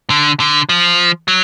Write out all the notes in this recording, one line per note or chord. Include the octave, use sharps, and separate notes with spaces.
D3
D3
F3
F#3